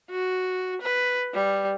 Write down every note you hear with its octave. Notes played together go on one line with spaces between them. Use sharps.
F#4
B4
G3